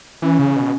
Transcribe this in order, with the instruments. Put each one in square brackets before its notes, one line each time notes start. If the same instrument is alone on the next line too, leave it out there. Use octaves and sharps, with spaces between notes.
[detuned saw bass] E3 [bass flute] C#4
[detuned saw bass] C#3
B2